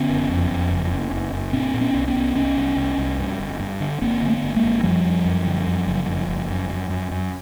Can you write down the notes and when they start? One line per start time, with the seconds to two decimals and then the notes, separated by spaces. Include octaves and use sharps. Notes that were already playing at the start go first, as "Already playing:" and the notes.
Already playing: D3 B3 C#4
0.09 F#1
0.29 F2
0.50 F2
0.71 F#1
0.91 F#1
1.12 F#1
1.33 F#1
1.53 A#2 C4 D4
1.74 A#2
1.81 B3 C#4
1.94 C2
2.08 B3 C#4
2.15 C2
2.35 C2 B3 C#4
2.56 C2
2.77 C2
2.98 C2
3.18 G2
3.39 G1
3.60 G2
3.80 D3
4.02 G1 A#3 C4
4.22 D3
4.28 A3 B3
4.42 G1
4.56 G#3 A#3
4.63 G1
4.83 F#2 F3 G3
5.04 F#2
5.26 F#2
5.46 D3
5.67 F#2
5.87 F#1
6.08 F#1
6.29 F#1
6.50 F#2
6.70 F#2
6.90 F#2
7.11 F#2